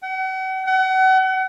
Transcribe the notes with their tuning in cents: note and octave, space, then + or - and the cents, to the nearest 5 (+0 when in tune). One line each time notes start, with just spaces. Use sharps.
F#5 +40
F#5 +35